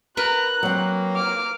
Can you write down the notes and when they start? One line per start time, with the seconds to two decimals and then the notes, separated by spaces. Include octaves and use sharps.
0.17 A#4 B4 A#5 F#6
0.63 F#3 A#3 C4
1.16 D6 F6